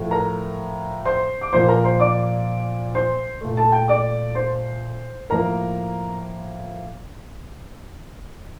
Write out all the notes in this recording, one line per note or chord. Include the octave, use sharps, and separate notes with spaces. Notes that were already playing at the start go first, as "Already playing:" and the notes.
Already playing: A2 F3 A3
A#4 A#5
C5 C6
D6
A#2 F3 A#3 C5 C6
A#4 A#5
C5 C6
D5 D6
C5 C6
A#2 A3
A4 A5
G5
D5 D6
C5 C6
A2 F3 A#3 A#4 A#5